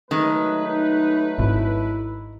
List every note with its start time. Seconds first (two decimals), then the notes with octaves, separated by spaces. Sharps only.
0.11 D#3 F#3 G#3 A3 B4
0.65 D#4
1.38 G#1 E4